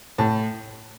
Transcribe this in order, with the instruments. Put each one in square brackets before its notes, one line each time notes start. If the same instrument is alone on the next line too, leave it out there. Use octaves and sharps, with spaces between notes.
[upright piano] A2 A5